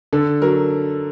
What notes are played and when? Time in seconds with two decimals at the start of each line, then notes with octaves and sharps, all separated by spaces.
0.13 D3 A4
0.42 F#3 A#4